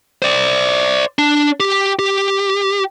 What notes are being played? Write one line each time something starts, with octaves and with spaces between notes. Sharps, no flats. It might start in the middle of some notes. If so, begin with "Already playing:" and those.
C5 D5
D4
G4
G4